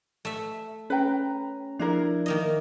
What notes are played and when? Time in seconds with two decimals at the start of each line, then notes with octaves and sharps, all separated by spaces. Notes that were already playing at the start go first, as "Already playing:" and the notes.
0.25 A3 E5
0.90 C#4 B4 G5 A#5
1.79 F3 D4 E4 A#4
2.26 D#3 A#3 D#5